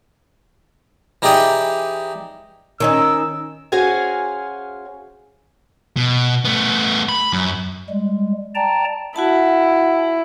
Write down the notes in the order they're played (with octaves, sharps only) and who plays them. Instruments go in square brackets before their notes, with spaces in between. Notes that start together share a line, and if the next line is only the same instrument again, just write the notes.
[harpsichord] E3 D#4 G4 G#4 D5 G5
[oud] D#3 C#4 D#4 [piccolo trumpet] E6
[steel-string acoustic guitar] C#4 F#4 G#4 C5 F5 G#5
[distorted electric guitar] B2
A3 B3
B5
F#2
[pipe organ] G3 G#3
D5 G5 A5 A#5
[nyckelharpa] E4 [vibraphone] F#4 F#5 A5